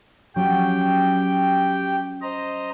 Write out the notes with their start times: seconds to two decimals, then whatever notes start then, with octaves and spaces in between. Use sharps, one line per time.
0.36 F#3 C#4 G4 G5
2.22 C5 D#5 A#5